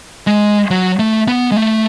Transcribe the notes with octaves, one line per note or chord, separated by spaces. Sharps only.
G#3
F#3
A3
B3
G#3
A3